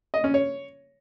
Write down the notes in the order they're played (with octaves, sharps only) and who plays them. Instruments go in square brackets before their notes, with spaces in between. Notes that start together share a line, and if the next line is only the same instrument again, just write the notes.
[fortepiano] D#5
C#4
C#5